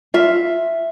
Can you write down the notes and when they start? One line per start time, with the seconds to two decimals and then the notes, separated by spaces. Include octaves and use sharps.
0.14 F4 E5